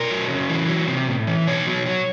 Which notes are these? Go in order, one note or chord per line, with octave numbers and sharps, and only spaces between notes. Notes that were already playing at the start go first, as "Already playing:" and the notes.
Already playing: B2 A#4
F#3
C#3
E3
F#3
C3
A2
E3
B2 C#5
F#3
F#3